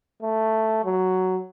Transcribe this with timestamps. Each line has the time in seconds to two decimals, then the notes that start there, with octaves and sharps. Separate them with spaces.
0.22 A3
0.85 F#3